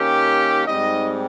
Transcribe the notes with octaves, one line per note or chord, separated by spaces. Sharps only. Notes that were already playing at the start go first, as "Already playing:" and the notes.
Already playing: D#3 A#3 C#4 G4
G#2 G3 C4 D#4 D#5